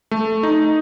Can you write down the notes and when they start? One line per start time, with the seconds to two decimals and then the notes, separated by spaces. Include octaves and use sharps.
0.11 A3
0.43 D#4